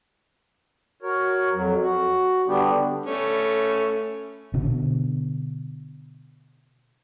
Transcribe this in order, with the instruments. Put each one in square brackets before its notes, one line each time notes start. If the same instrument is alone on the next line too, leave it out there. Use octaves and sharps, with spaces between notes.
[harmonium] F#4 A#4 C#5
F2 F#3
F#4
D3 G3 B3 D4 G4
[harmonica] A3 C#4
[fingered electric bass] B2 D3